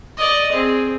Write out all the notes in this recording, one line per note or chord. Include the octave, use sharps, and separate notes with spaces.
D5 D#5
C4 G#4